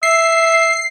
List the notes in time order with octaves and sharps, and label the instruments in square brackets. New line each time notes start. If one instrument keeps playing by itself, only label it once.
[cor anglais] E5 [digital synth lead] C7